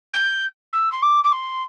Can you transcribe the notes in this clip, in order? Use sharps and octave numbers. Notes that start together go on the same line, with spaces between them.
G6
E6
C6
D6
D6
C6